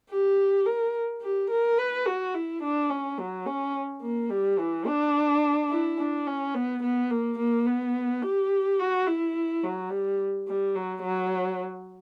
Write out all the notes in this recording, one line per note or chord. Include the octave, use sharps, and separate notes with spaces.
G4
A#4
G4
A#4
B4
F#4
E4
D4
C#4
F#3
C#4
A#3
G3
E3
D4
E4
D4
C#4
B3
B3
A#3
A#3
B3
G4
F#4
E4
F#3
G3
G3
F#3
F#3